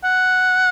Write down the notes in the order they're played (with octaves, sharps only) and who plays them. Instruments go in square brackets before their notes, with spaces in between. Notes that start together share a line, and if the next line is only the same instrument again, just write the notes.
[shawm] F#5